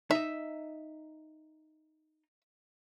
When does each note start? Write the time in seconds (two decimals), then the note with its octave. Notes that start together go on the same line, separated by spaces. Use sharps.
0.11 D#4 D#5 E5